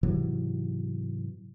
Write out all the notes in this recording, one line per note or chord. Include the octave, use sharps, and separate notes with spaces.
G#2 C3 E3 F#3